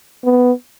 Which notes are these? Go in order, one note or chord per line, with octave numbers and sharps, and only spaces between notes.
B3